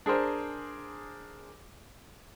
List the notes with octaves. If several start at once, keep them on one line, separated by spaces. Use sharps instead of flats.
D4 G#4 A#4 C5